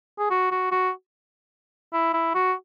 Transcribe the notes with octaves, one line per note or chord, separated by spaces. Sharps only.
G#4
F#4
F#4
F#4
E4
E4
F#4